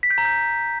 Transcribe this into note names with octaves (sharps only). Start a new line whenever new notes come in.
B6
G6
A#5
G6